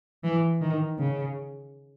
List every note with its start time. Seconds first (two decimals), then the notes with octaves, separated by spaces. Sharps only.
0.24 E3
0.61 D#3
0.99 C#3